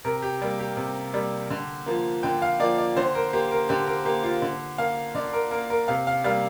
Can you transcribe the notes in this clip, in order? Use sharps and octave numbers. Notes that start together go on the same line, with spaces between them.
C3 A#4
G4
G3 A#3
G4
C3
G3 A#3
D3
F3 A#3
D3 G5
F5
F3 A#3 D5
D5
D3 C5
A#4
A#3 G4
A#4
D3 G4
A#4
A#3 G4
F4
D3
A#3 F5
D3 D5
A#4
A#3 A#4
A#4
C3 F5
F5
G3 A#3 F5